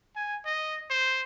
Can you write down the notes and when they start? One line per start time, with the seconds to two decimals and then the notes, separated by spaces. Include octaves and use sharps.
0.16 G#5
0.45 D#5
0.90 C5